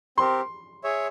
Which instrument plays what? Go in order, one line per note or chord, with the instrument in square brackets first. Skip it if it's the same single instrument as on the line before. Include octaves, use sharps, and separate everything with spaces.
[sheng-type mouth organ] C4 G4 A#4 [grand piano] C6
[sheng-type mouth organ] G#4 C#5 E5